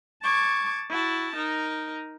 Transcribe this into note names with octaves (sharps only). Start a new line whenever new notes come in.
A5 C#6 D6 G#6
E4 F#4 A5
D#4 A#4